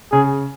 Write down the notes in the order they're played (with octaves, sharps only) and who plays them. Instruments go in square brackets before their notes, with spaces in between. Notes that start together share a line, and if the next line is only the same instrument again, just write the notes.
[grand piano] C#3 [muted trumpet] G#4